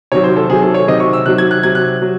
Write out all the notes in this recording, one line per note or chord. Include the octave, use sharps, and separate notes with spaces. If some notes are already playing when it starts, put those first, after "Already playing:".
C3 D#3 F#3 C#5
C5
A4
C3 D#3 F#3 G#4
A4
C#5
C3 D#3 F#3 D#5
C#6
E6
C3 D#3 F#3 F#6
G#6
F#6
C3 F#3 G#6
F#6
F#3